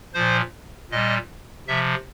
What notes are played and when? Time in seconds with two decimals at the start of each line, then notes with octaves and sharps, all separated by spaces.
0.14 A#2 F3 C5
0.91 A#2 G3 D#5
1.68 C3 F3 E5